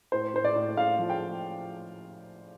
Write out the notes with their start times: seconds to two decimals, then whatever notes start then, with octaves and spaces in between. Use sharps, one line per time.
0.12 A2 C5
0.34 A2 C5
0.44 D5
0.56 A2
0.77 A2 F5
0.99 F3
1.10 G5